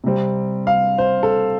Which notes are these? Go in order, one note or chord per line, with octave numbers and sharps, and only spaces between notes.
C3 G3 C4
F5
C5
A4